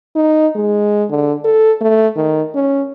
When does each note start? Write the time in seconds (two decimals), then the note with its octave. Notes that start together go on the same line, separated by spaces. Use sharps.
0.15 D#4
0.56 G#3
1.10 D3
1.44 A4
1.81 A3
2.16 D#3
2.55 C#4